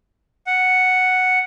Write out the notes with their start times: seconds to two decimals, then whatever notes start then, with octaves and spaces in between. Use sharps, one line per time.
0.47 F#5